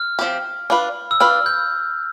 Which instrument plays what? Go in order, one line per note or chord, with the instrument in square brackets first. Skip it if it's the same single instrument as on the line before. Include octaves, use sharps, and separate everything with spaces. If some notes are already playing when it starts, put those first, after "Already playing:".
Already playing: [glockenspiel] F6
[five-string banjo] F3 C4 G4
D4 F4 B4
[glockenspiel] E6
[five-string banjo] D4 F4 B4 [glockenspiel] F6
[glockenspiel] G6